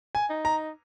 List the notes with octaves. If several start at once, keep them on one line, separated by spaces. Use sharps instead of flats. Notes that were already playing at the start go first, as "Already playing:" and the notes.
G#5
D#4
A#5